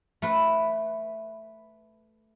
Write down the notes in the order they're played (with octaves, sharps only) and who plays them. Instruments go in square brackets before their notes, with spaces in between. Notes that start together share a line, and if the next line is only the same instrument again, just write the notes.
[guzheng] A3 B4